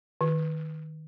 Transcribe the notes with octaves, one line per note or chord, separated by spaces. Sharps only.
D#3